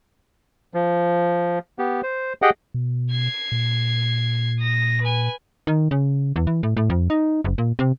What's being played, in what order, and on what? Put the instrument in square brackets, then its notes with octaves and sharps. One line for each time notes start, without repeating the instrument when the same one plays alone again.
[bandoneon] F3
B3 G4
C5
G4 G#4 D#5 F#5 G5
[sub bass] B2
[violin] G#6 C7
[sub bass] A#2
[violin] D#6 A#6
B4 G#5
[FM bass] D#3
C#3
E2
E3
A2
A2
F2
D#4
F#1
A#2
C3